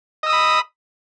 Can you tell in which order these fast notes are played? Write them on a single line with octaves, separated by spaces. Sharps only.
D#5 E6 D#6 B5